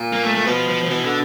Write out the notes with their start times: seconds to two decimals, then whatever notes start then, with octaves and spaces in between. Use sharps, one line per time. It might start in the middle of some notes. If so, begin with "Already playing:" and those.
Already playing: A#2
0.13 A#3
0.24 A3
0.34 A3
0.46 B2 F3
0.68 F3
0.83 F3
0.90 B2 E3
1.04 D3